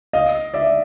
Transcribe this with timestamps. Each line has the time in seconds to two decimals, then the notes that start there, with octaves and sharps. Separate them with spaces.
0.13 D#5 F5
0.54 D5 E5